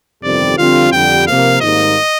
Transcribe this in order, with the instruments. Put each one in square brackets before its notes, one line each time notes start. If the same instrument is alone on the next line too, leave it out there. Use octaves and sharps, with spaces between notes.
[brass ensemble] G1 F2 C3 D#3 G3 [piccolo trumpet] D5
[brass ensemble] F2 D3 G3 C4 F4 [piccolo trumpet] F5
[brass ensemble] F2 D3 G3 [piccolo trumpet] G5
[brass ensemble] C3 F3 A#3 [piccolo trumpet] F5
[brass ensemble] G#1 G#2 D#3 G3 A#3 [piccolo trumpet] D#5